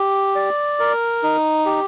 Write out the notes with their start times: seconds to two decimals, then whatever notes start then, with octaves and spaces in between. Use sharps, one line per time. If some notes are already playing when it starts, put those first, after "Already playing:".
Already playing: G4
0.35 D5
0.80 A#4
1.23 D#4
1.66 G4